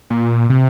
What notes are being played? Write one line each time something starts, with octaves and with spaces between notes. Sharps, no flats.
A#2
C3